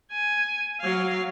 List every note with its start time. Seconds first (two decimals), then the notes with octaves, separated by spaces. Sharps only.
0.12 G#5
0.81 F#3 F5